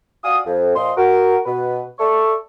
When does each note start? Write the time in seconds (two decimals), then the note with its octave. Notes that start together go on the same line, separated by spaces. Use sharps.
0.23 F4 F#4 D5 F5 G#5 D#6
0.45 F2
0.75 A#2 F3 F4 D#5 C6
0.97 F#4 A#4
1.45 B2 B4
1.99 A4 D5 E5 C#6